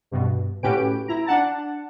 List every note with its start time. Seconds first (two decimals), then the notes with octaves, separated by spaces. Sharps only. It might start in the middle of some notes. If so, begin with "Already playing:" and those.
0.11 G2 B2
0.63 A2 C#4 F#4 G4 B4 D7
1.08 E4 A#5
1.26 D4 F#5 A5